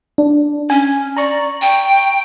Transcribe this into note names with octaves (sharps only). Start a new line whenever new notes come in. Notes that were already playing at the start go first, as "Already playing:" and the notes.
D4
C#4 G#5
D5 A#5 C#6
G5